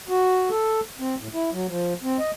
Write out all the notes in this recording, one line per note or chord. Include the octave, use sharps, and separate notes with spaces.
F#4
A4
C4
A2
E4
F#3
F3
C4
D#5